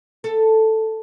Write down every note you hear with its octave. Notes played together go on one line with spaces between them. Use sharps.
A4